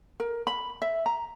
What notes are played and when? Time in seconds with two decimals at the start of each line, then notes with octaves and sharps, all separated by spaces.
0.20 A#4
0.47 B5
0.82 E5
1.06 A#5